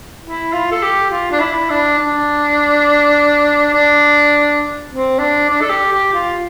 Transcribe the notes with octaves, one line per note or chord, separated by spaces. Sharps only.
E4
F4
A4
G4
F4
D4
E4
D4
D4
D4
C4
D4
D4
A4
G4
G4
F4